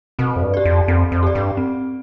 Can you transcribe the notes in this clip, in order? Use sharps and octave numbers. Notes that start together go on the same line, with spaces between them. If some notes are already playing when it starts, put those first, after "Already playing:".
B2 C4
F2
G2
G4 D5
F2
F2 C4
F2
G4 D5
G2
C4